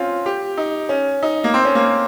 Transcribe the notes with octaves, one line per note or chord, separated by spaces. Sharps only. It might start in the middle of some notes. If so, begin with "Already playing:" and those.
Already playing: C4 C#4 F4
G4
D#4
C#4
D#4
A#3
C4
C#4
A#3